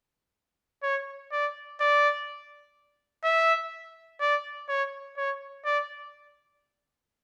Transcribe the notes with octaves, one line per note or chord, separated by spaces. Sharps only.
C#5
D5
D5
E5
D5
C#5
C#5
D5